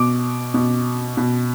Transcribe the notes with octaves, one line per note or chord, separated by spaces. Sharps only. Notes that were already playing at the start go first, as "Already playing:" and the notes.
Already playing: B2 D6
B2
B2